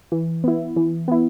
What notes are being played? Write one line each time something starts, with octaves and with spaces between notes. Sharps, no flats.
E3
B3 E4
E3
B3 E4